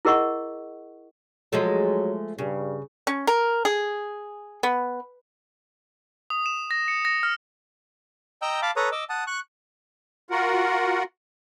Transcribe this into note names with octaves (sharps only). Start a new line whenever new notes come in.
E4 G#4 A#4 D#5 F#5 C#6
F3 F#3 G#3 A3
G2 C#3
C#4
A#4
G#4
B3
D#6
E7
A#6
C#7
A#6
F6
D#5 G5 A#5 E6 G6
F5 A5 B5 D6
A4 B4 C#5 A#5 D#6
D#5 D6 E6
F#5 A5 D#6
C#6 F#6
F4 F#4 A#4 F#5